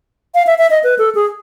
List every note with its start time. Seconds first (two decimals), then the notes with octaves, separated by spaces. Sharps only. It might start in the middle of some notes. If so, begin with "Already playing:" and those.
0.34 F5
0.47 E5
0.58 E5
0.70 D#5
0.83 B4
0.98 A4
1.15 G#4